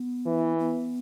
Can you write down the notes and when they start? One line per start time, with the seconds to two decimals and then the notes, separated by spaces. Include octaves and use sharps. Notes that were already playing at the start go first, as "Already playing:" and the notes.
Already playing: B3
0.26 E3
0.59 B3